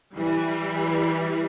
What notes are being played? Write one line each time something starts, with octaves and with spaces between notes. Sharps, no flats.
E3 G3